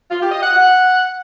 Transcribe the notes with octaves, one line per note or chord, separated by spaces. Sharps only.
F4
G4
D#5
F#5
F#5